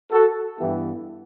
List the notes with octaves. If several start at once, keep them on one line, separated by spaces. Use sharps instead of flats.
F#4 A4
G2 E3 B3 E4 G4